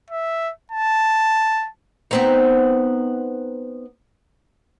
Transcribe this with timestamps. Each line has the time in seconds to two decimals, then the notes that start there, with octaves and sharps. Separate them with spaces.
0.11 E5
0.72 A5
2.11 B3 C4 D#4